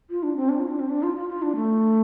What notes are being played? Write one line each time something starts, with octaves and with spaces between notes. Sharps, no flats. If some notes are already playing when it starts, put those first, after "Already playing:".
F4
D4
C4
D4
F4
D4
C4
D4
F4
F4
F4
D4
A3